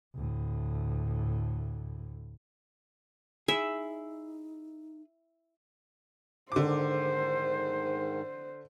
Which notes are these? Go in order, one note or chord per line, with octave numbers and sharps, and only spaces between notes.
D2 A2
D#4 E4 G#4 E5
G#2 D3 D#3 C5 D6